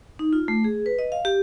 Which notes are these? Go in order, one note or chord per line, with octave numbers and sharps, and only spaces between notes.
D#4
F4
A3
G#4
B4
D#5
F5
G4